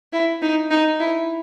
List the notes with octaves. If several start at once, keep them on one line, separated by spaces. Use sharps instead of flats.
E4
D#4
D#4
E4